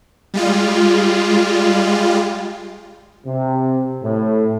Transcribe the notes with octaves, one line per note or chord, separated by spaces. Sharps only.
G3 G#3 F4
C3
A2